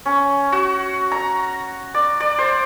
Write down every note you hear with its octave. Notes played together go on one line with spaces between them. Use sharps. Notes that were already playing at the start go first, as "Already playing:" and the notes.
C#4
F#4
A#5
D5
D5
C5